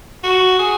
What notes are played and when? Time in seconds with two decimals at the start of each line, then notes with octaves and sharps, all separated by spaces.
0.23 F#4
0.59 G#4